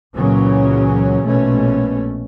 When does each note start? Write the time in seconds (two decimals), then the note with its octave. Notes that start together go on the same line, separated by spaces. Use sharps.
0.16 C#2 A#2 C#3 E3 F#3 C#4
1.23 A#1 B2 A3 C#4